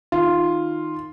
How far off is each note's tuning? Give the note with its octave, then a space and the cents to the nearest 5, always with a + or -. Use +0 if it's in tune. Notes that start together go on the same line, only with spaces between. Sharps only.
D#3 +0 F4 +0